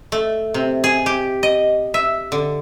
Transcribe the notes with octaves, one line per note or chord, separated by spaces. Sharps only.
A3
C3
G#4
G4
D#5
E5
D3